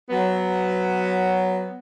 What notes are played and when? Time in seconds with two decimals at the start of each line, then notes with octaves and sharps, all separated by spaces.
0.10 F#3 B3